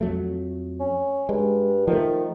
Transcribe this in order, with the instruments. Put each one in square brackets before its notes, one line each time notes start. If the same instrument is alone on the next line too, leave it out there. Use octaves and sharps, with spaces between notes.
[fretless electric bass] F2 F#3 A3
[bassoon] C#4
[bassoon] G2 [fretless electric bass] G#3
[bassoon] D#3 [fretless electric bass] F3 A3